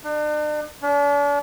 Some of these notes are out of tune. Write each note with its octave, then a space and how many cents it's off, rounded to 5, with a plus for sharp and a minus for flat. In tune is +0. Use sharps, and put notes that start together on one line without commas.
D4 +40
D4 -40